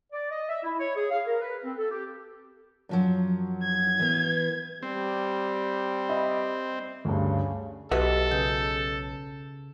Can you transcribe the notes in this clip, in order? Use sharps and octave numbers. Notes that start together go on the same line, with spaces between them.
D5
D#5
E5
E4
C#5
G#4
F5
A#4
B4
C4
A4
G4
F#2 F3 F#3
G#6
E3 B3
G3 C4
D#5 E5 B5
D2 G2 C#3
B1 F#4 G4 A4 B4 D#5 E5 F#5
C#3 G6